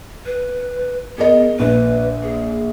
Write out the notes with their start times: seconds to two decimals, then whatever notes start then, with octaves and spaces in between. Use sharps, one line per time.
0.26 B4
1.18 B3 G#4 A#4 D#5
1.59 A#1 B4
2.23 G#4